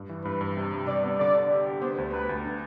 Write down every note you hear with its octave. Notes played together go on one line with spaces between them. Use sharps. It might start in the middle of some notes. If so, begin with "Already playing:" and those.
Already playing: G2
E3
G2 B4
G2
C3
G3
C3 D5
B3
D3 D5
D3
G4
G4
B3 C5
D2
D2 B4
D2
D4